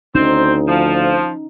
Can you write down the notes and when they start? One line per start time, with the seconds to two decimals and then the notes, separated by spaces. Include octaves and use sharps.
0.15 D2 C4 C#4 D#4 C5
0.68 F3